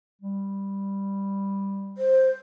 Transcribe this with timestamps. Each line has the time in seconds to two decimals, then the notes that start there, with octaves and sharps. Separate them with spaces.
0.21 G3
1.98 C5